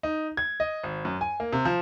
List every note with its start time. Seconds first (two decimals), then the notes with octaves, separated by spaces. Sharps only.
0.03 D#4
0.37 G#6
0.60 D#5
0.84 G#1
1.05 F#2
1.21 G#5
1.40 A#3
1.53 C3
1.65 F3